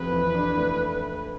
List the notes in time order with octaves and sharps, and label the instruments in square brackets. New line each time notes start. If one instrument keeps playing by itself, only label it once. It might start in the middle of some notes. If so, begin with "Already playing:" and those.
Already playing: [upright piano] F2 C3 [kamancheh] B4
[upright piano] E3
D4
A3